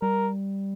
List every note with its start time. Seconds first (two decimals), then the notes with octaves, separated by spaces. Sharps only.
0.02 G3 A#4